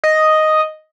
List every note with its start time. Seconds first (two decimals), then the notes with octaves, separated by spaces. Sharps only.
0.04 D#5